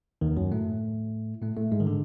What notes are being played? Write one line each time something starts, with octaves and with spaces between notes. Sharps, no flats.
D#2 D#3
F#2 F#3
A2 A3
A2 A3
A2 A3
G#2 G#3
D#3
D3